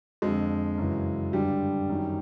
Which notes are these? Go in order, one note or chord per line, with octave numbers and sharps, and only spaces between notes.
F2 D3 G#3
F#2 C#3 E3
G2 D3 G3
F#2 D#3